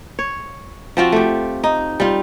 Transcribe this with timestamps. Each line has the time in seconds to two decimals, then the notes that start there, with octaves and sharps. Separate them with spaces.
0.19 C#5
0.97 F3 C4 F4 F#4
1.12 A3 G4
1.64 D#4
2.00 G3 F4